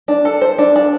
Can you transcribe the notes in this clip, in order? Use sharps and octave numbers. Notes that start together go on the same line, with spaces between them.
D4
A4
C5
D4
D4